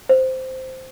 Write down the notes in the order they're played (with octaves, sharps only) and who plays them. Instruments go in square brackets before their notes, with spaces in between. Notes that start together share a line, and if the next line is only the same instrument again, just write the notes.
[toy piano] C5